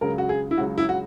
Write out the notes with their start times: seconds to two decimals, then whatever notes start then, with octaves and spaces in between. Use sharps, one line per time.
0.01 C#2 C#3 F#3 A#4
0.18 F#4
0.29 G#4
0.51 E4
0.57 C#2 C#3 F#3 F#4
0.78 E4
0.89 F#4